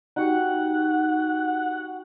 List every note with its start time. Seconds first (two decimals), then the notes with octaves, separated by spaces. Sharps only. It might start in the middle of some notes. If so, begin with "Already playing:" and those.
0.16 D#4 F#4 G4 F#5